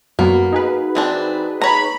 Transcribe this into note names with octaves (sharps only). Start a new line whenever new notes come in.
F#2 F#3 A#3 B3 F#4
D#4 G#4 B4
E3 C4 D4
C#5 A#5 B5